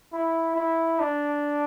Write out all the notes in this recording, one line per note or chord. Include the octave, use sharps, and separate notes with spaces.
E4
E4
D4